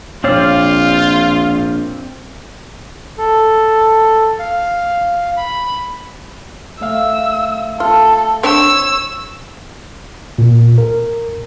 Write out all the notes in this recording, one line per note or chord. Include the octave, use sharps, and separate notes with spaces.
A#1 C4 F4 C#5 D5 F5
A4
F5
B5
A3 E5 F5 E6
F4 A4
C4 D4 C#5 E6
A#2
A#4